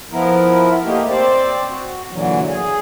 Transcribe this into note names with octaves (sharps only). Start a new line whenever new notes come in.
F3 B3 E4 A#4
A3 A#3 D#4 G4
C4 C5 D5
F#4
A#2 D3 E3 F#3
G#4